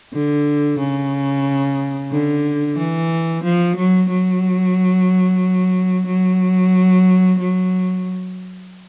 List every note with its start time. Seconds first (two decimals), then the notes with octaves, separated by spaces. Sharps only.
0.14 D3
0.79 C#3
2.11 D3
2.77 E3
3.43 F3
3.76 F#3
4.09 F#3
6.06 F#3
7.39 F#3